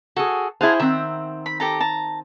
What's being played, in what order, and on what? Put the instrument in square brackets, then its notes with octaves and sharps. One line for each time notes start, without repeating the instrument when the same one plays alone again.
[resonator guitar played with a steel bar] F#4 G#4 [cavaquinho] A4
[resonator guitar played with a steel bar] E4 G#4 C5 [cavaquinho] F5 F#5 A5
[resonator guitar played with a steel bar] D#3 C4 [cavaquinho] E5 F#5
[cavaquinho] B5
G4 A4 A#5
A5 A#5